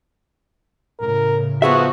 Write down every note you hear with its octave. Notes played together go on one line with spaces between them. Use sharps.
A2 C#3 A#4
F3 B3 F#4 G#4 E5